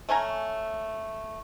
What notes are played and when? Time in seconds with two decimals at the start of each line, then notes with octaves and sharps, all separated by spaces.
0.09 A3 C#4 G#5 A#5